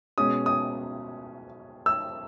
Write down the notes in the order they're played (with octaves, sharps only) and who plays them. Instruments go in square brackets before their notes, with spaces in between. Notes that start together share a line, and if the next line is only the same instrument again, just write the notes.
[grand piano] B2 G#3 C#4 D#6
D#6
E6